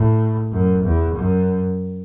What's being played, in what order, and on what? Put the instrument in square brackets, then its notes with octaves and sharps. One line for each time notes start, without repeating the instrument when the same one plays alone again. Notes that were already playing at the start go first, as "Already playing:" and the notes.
Already playing: [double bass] A2
F#2
E2
F#2